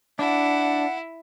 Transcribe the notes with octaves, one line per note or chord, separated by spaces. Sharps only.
D4 E4 F#5